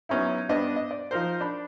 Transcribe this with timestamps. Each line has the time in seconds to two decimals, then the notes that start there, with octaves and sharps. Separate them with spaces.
0.09 F#3 B3 C#4 D#4 E4
0.49 G2 B3 D4 D#5
0.76 D#5
0.91 D5
1.11 F3 D#4 A#4 C5
1.41 D4 B5